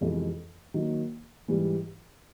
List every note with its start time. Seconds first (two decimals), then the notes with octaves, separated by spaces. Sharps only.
0.01 F2 C3 E3 G#3 B3
0.74 D#3 F#3 A#3 D#4
1.48 G#2 E3 G3